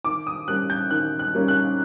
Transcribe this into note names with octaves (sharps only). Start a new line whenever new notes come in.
D#3 D6
D#6
G3 A#3 C#4 F#6
G6
D#3 F#6
F#6
G3 A#3 C#4
F#6